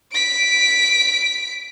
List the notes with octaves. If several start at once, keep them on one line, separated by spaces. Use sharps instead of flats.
B6 D7